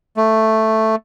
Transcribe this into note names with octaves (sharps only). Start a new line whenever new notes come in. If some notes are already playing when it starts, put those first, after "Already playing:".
A3